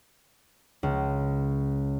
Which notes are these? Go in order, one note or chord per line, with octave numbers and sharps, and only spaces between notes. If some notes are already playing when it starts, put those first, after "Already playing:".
C#2